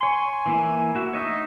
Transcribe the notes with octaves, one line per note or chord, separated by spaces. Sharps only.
C#5 G#5 C6
E3 A#3 E4
A#3 F#4 E5
A3 D4 D#4 C#5 D#5 E5